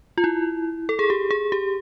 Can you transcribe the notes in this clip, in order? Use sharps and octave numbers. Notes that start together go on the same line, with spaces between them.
F4
E4
A4
G#4
G4
G#4
G4